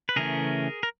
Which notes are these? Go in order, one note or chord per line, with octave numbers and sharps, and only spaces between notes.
B4
C#3 E3 A3 C#4 G#4 A#4
A#4